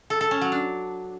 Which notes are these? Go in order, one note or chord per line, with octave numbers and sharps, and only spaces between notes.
A4
A4
C#4
F#3
D4